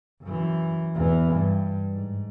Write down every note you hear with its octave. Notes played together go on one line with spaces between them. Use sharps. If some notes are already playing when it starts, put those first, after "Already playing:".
F#2 E3
E2 E3
G2
G#2